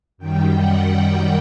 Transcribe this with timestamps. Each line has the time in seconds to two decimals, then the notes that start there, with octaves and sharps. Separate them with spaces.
0.18 F#2 D#3 G3 G5
0.55 F#5
0.92 G5